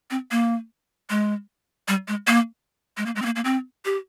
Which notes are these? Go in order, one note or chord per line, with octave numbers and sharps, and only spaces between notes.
C4
A#3
G#3
G3
G#3
A#3
G#3
A#3
G#3
C4
A#3
A#3
C4
G4